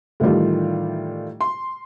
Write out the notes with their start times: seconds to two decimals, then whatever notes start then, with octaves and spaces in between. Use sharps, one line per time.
0.20 A2 D#3 E3 G3 F4
1.41 C6